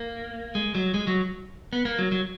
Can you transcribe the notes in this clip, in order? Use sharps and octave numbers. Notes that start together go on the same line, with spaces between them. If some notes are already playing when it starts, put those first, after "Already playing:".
Already playing: A#3
G#3
F#3
G#3
F#3
B3
A#3
F#3
F#3